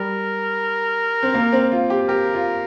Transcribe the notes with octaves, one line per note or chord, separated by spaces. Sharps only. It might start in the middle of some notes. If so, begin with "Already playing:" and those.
Already playing: G3 A#4
C4
A#3
C4
F4
G4
G4 A#4
F4